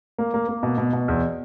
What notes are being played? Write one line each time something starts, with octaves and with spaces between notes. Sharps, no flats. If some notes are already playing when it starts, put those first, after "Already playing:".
A#3
A#3
A#3
B2
B2
B2
E2